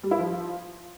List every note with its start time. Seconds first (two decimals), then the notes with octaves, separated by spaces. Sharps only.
0.03 G3
0.11 E4
0.19 F3